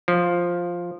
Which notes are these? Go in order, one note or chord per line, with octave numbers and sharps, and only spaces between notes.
F3